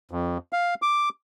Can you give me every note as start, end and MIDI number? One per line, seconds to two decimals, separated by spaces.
0.11 0.38 41
0.53 0.74 77
0.82 1.09 86